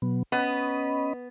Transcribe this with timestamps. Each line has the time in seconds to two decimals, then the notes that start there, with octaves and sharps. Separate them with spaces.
0.02 B2 F#3 B3
0.32 B3 C#4 D#5 B5